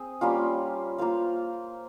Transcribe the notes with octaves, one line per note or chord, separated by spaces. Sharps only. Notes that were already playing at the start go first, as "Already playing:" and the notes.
Already playing: C4 G#4
G3 A#3 C#4 F4
A#3 F4 C5 F5